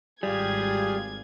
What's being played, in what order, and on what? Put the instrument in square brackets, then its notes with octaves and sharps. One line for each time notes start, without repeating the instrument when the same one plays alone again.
[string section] G#1 G#6 [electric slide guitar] G3 [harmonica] F4 G4 G#4